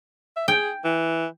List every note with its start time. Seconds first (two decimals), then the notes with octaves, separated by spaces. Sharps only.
0.36 E5
0.48 G#4 G5
0.85 E3